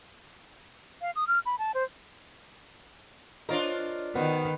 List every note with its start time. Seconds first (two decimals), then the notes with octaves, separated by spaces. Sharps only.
1.02 F5
1.16 D#6
1.27 F6
1.46 B5
1.59 A5
1.74 C5
3.49 D4 F4 A#4 C5 C#5 D#5
4.15 D#3 B3 D#4 F#4 C5